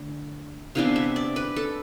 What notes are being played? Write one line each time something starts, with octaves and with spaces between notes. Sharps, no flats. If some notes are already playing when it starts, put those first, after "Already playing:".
Already playing: D3 A3 D4
C3 E3 B3 D4 F5
E5
D5
B4
A4